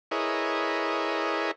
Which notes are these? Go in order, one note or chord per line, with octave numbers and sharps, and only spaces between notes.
E4 G#4 A#4 B4 C#5 D#5